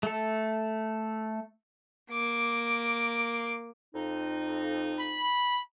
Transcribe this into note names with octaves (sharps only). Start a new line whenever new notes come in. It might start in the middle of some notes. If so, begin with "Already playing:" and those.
A3 A4
A#3 D6
F2 D#4
B5